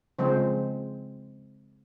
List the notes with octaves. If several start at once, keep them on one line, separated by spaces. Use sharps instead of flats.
C#3 F3 G#3 C4 C5